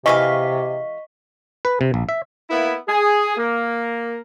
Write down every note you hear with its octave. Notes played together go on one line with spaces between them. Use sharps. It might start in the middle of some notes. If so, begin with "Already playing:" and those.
C3 E3 G#3 D#5 F5 C#6 B6
B4
C3
A#1
E5
A#3 B3 E4
G#4
A#3